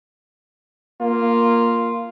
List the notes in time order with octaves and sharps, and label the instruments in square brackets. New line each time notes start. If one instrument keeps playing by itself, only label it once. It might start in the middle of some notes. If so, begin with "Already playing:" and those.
[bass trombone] A#3 [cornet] F4